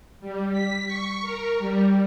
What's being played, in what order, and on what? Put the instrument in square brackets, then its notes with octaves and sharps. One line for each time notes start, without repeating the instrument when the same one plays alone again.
[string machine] G3
B6
C#6
A#4
G3